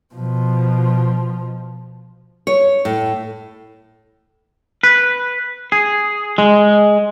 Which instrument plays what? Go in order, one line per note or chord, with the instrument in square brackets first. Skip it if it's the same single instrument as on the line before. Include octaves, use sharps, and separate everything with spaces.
[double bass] B2 F3
[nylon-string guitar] C#5
A2
[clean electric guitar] B4
G#4
G#3